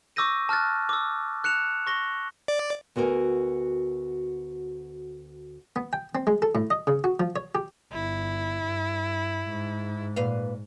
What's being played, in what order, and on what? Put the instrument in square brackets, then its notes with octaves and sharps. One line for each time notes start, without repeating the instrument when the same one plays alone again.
[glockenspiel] C#6 D6 E6 G6 A#6 D#7
A5 F6 F#6 A6
D6 E6
F#6 C#7 E7 F7
C#6 A#6 G7
[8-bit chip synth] D5
[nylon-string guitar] D2 B3 F#4 A#4 G#5
[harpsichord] B3
G5
C4
G#3
A4
A2
D#5
C#3
F#4
F3
C#5
G4
[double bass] G1 [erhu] E4
[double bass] G2
G#2
[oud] A#2 B4 F5